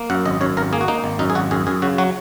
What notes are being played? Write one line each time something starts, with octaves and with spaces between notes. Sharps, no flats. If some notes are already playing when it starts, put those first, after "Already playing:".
Already playing: A#3
F#2 F#5
G#1 D#5
F#2 C#5
G#1 A#4
A#3 G#4
F#4
A#3 D#4
G#1
F#2 D#4
G#4
G#1 F#4
F#2 G#4
F#2 G#4
C#3 F#4
F#3 F#4